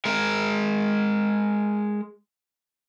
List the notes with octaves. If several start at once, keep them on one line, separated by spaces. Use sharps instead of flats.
G#3 A#4